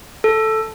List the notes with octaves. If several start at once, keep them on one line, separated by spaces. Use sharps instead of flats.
A4